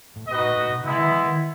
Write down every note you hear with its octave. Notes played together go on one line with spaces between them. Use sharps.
A2
A#2 D#4 F#4 B4 D#5
A2
A2
B2
C#3 G#3 B3 E4
D#3
E3
D#3